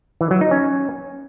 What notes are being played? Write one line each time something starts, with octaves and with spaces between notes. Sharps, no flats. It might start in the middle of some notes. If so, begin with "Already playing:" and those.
E3
F#3
D#4
C#4